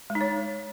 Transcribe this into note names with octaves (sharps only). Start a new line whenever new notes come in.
G#3
D#4
C#5